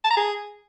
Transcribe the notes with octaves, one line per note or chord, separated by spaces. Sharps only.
A5
A#5
G#4